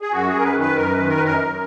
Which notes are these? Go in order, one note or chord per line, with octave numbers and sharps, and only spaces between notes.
G#4
F#2 F#4
G#4
F#2 A#4
B4
D#3
B4
F#2 A#4
B4
D#3
A#4
B4
F#2
A#4
F#2